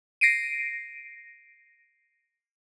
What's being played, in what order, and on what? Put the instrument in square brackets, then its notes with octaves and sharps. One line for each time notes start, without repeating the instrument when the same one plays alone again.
[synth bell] A#6 C7 D7 D#7